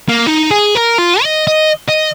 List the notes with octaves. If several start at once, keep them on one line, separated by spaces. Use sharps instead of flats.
A#3
D#4
G#4
A#4
F4
D#5
D#5
D#5